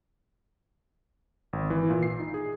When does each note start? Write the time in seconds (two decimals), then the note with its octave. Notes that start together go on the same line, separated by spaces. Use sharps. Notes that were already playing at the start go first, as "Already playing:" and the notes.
1.53 G#1
1.70 E3
1.90 A#2
2.03 C7
2.19 D#4
2.34 G#4